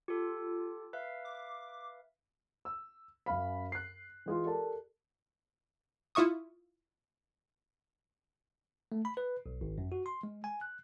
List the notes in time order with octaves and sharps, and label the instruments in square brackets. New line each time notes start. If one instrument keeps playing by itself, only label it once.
[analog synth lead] F4 [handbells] G4 A4
[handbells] B4 E5 F5
[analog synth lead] D6
[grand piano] E6
F#2 C#4 F5 B5
F#6 C7
E3 G#3 F4
G4 A4 A#4 D5 A5
[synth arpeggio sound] E4 F4 E5 C#6 D#6
[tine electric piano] A3
B5
B4
B1
G#1
F#2
F#4
C6
G#3
G#5
F#6